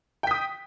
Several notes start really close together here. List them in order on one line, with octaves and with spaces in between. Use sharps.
G5 B6 D#6